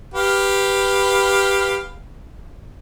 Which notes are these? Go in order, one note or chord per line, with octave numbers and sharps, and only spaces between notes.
G4 B4 F5